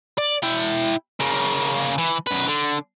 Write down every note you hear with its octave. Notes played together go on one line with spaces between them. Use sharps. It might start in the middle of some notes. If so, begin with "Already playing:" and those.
D5
E4 G5
C#3 A#3
E3
F#2 B4
D3